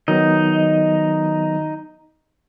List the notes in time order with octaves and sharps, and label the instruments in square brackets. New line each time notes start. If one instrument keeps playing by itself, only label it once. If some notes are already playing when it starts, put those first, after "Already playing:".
[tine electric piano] D#3 F#3 B3 [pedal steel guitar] D#4 D#5